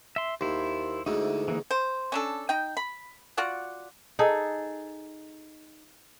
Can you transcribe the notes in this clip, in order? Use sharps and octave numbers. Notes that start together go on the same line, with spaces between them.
E5 C6
D#2 E4 C5
D2 G#2 D3 D#4 E4
E3 A#3 D#4
C5
C#4 D4 A4
D#4 G5
B5
F4 F#4 D5 F#5
D#4 G#4 A4